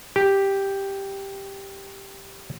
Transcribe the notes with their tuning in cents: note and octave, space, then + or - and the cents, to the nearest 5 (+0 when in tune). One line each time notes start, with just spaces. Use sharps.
G4 +0